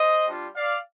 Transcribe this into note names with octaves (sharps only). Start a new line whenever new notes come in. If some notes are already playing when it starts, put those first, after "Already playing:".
Already playing: C5 D#5
G3 D4 F4
D5 F5